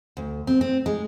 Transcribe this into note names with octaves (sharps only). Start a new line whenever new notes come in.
D2
C4
C4
G#3